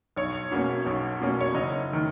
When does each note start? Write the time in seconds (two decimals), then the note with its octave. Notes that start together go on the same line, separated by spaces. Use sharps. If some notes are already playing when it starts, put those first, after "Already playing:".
0.16 B1 C#5
0.51 B2 A#3 C#4
0.86 B1
1.20 B2 A#3 C#4
1.41 C#5
1.54 F#1 D#5
1.93 D#3